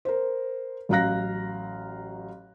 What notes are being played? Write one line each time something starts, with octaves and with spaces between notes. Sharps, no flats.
A#4 C5
A1 F#3 F5 A#5 F#6 A#6